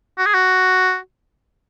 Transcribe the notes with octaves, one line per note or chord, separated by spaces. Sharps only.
F#4
G#4
F#4